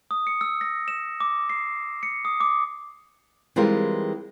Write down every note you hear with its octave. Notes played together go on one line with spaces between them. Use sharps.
D#6
C#7
E6
A#6
E7
D6
C7
C#7
D#6
D6
E3 G3 G#3 C4 F4 A#4